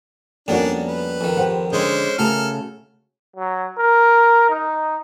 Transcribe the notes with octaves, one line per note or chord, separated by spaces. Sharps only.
F2 G3 A#3 B3 C#4 D4 F#4
B4
F2 D#3
G4 C5 F#5
D3 G#3 C#4 C5
C#3 A3 F#4 A4 A#4 F6
F#3
A#4
D#4